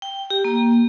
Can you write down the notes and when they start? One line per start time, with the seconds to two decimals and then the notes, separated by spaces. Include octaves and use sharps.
0.02 G5
0.30 G4
0.44 A#3